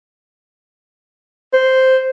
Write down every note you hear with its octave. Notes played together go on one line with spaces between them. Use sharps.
C5